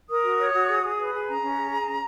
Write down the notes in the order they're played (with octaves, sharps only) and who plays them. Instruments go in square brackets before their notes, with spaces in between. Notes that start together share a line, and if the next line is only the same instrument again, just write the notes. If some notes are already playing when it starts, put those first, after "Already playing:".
[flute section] A#4 D#6
F#4
C#5
F#4
G#4
G#4
B4
G#4
C#4 A#5
C#4
G#4
G#4
C#4